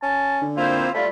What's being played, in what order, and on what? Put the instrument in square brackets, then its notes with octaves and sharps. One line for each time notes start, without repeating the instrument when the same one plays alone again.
[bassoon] C#4 [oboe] A5
[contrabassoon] D3
[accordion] A#3 C4 C5 [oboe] E4 [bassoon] F4
[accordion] G3 F4 [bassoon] A3 [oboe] B5